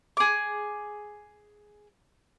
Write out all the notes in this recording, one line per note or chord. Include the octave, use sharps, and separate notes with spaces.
G#4 D6